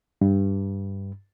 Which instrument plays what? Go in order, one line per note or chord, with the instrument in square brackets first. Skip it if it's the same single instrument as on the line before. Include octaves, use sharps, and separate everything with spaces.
[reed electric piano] G2